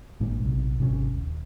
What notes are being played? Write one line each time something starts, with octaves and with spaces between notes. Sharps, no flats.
G#1 A#2 G#3 D4
A#1 C3
G#1 C3 D#3 C#4
D#1